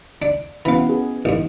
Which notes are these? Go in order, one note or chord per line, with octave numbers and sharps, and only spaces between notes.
D4
E3 B3 C#4 F5 B5
G#4
A1 G#2